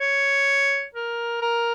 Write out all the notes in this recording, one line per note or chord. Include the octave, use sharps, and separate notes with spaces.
C#5
A#4
A#4